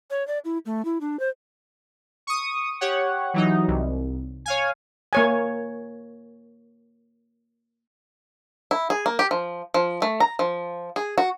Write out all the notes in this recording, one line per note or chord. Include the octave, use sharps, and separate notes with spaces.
C#5
D5
E4
A3
E4
D4
C5
C#6 D#6
G4 C#5 F#5
E3 F#3 D#4
C2
C#5 F5 G#5
A#3 C#5 G#5
E4
G#4
A#3
G4
F3
F3
A3
A#5
F3
G#4
F#4